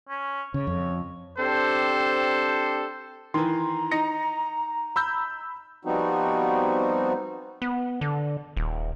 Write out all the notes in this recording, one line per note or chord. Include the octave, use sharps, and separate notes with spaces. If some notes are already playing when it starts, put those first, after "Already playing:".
C#4
C#3 C#5
F2
C4 D4 G4 A4 C5
D#3 E3 A#5 C6
D#4 A#6 C#7
B5 E6 G6
F3 G3 B3 C4 D#4 F#4
B3
D3
D#1